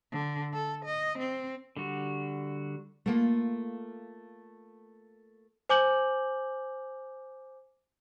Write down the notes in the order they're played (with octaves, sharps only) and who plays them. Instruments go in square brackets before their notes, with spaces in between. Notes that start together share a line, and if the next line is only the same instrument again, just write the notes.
[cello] D3
A4
D#5
C4
[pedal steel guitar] D3 G3 F#4
[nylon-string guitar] A3 A#3 F4
[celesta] C5 G#5 D6 G6 F#7